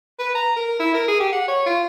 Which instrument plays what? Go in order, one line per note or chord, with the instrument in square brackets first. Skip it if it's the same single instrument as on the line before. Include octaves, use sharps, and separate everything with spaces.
[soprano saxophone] B4
A#5
A#4
E4
A#4
G#4
G4
F#5
C#5
F4